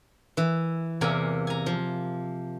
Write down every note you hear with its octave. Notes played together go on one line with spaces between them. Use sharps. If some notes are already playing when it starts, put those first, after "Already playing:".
E3
E2 C3 A#3 G#5 A#5
G#5 A#5
F3